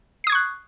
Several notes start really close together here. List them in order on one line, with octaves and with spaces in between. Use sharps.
C7 D#6 G#6 C#6 F#6